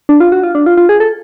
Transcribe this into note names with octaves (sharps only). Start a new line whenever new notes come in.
D4
F4
F#4
F4
D4
F4
F4
G#4
A4